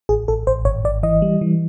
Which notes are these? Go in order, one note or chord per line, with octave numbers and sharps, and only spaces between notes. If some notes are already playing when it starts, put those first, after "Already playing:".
A1 G#4
A1 A4
A1 C5
G#1 C#5
G#1 D5
E3 D#5
G3
E3